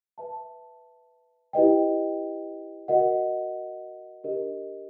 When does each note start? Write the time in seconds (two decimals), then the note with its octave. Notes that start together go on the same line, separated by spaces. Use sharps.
0.18 B4 E5 A5
1.53 E4 G4 B4 D#5 G5
2.88 F#4 A#4 D#5 F#5
4.24 D4 G4 A#4 D#5